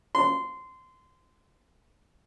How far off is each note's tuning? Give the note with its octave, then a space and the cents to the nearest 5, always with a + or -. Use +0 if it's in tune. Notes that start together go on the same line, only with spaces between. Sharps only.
C6 -20